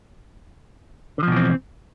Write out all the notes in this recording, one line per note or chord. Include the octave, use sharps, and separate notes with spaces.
B2 D3 E3 F3 C4